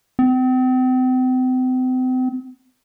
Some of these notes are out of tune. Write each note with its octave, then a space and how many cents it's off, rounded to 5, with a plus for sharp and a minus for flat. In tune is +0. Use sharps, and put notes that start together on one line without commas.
C4 -40